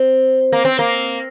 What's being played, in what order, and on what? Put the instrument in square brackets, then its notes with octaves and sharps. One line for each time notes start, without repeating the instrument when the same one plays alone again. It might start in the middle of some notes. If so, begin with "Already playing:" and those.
Already playing: [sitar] C4
A#3
C4
A#3